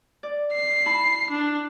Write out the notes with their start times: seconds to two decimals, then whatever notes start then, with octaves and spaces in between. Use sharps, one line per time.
0.23 D5
0.53 C7
0.86 E4 A5 B5
1.31 D4